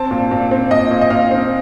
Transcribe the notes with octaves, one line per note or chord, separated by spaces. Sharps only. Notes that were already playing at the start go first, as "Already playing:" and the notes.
Already playing: C4 A5
A#2
A#2
C4
A#2 D#5
A#2
D#5
A#2 F5
C4